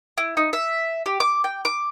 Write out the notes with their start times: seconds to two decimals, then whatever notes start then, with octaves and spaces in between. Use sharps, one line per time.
0.18 E4
0.37 D#4
0.53 E5
1.06 G4
1.20 D6
1.44 G5
1.65 D6